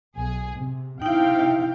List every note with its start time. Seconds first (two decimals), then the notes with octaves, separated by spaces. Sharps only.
0.15 B1 G#4
0.58 C3
1.02 C3 D#4 E4 F5 G5